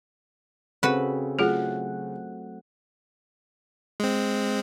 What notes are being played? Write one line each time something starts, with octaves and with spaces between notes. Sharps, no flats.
C#3 C4 F#4 A4 B4
F#3 A3 F4 G#4 F#5
G#3 C4